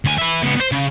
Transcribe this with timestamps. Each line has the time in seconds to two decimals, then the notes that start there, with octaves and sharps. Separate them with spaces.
0.05 D2 G#5
0.18 B4 E5
0.44 C#2 B3
0.57 B3 C5
0.72 C#3